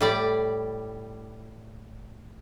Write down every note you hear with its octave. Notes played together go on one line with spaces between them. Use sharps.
A2 G3 D5